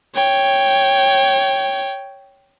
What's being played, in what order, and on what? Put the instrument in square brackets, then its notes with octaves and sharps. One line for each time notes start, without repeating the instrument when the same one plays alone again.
[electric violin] C#5 G5